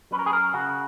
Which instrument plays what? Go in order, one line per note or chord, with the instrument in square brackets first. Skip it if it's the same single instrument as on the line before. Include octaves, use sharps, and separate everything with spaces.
[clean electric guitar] F#3 C#4 B4
A#4
G#4
A#4
C#3 F#4